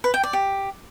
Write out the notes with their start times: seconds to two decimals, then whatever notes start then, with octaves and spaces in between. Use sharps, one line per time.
0.04 B4
0.14 G5
0.24 D5
0.33 G4